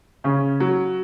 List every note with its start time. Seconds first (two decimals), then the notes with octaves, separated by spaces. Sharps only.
0.24 C#3 C#4
0.60 F#3